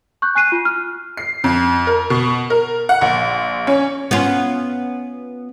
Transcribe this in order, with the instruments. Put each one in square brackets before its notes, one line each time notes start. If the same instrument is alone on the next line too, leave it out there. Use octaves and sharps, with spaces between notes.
[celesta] C#6 F#6 G6
G#5 F#6 C7 D#7
F4
F6
[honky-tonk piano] C7
F2
A#4
B2
A#4
F#5
A#1
C#4
[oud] B3 C#4 F4